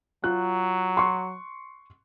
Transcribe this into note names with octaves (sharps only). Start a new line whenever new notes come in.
F#3 F4 F#6
C6 C#6